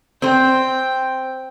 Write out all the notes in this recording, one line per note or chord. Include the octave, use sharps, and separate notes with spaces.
C4 C5 G5